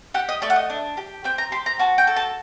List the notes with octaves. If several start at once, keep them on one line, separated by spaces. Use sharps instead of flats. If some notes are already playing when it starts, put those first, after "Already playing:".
G4 F#5
D#5
A3 D5
F#5
D#5
D4
G4
C4 G5
A#5
G4 C6
A#5
F#4 A5
G5
A4
A5